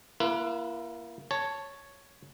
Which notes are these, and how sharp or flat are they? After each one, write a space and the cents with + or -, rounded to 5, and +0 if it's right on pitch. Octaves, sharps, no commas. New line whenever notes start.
A#3 +20 E4 +40 B4 -20
C#5 +0 A5 +0